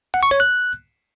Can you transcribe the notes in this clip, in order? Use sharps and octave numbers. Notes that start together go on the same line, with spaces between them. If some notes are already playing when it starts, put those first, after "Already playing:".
F#5
C#6
C#5
F#6